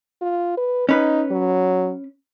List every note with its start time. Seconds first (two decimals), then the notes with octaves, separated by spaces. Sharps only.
0.21 F4
0.57 B4
0.89 C#4 D#4 B4
1.31 F#3